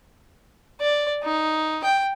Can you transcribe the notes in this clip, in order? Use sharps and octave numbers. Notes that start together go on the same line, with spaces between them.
D5
D#4
G5